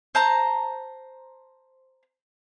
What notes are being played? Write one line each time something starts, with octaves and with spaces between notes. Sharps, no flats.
C5 A5 A#5